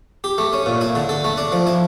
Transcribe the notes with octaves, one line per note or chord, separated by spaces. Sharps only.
G4
A3
C#4
A#2
E4
D3
A4
A3
D4
F3
E4